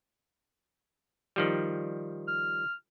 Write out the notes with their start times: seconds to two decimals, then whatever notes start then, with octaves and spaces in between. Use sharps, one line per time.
1.36 D#3 F3 G3
2.28 F6